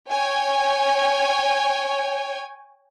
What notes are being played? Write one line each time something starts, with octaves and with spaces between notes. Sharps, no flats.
C#5 G5 G#5